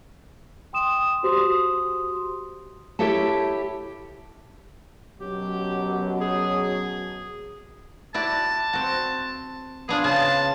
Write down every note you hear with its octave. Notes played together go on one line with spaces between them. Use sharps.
G5 C6 D#6 E7
F#4 G4 C5 C6 D#6
E4 G4 A4 C#5 E5 A5
F#2 B2 F#3 G4
G#4
E4 F#4 D5 A5
C4 F#4
B3 D4 F4 G#4
C#3 A5